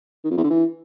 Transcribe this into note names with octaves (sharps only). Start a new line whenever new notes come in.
D#3
F2
E2
D3
E3